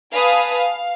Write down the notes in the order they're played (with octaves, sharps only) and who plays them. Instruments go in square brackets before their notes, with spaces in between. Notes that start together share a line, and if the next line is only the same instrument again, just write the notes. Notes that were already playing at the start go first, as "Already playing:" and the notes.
[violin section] B4 F5 G#5 A5 D#6
F5